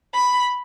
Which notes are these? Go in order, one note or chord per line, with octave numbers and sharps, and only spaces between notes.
B5